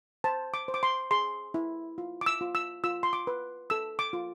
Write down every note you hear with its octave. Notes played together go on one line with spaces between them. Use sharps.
C5 A5
D6
C5
D6
C6
G#4 C6
E4
F4
D6
E6
F4
E6
F4 E6
C6
D6
B4
A4 E6
D6
F4